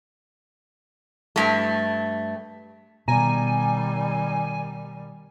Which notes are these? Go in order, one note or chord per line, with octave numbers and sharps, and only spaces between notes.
G2 A3
B2 D#3 G3 G#5 A#5